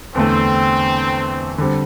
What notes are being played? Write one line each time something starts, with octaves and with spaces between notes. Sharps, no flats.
E2 D3 A3 C4
D3 G3 C4